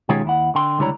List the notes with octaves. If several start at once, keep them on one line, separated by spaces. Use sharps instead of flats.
B2 D#3 G#3 C#4 F4 G4
D#2 E4 F#5
D3 G5 C6
C#2 D3 G3 E4 C#5 A#5